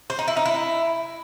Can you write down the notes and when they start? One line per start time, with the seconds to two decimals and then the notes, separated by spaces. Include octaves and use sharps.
0.10 C5
0.19 D#4
0.28 E4
0.37 D#4
0.46 E4